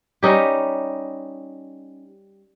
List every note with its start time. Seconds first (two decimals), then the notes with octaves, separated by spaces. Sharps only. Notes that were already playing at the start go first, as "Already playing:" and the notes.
0.23 G3 C#4 D#4 G4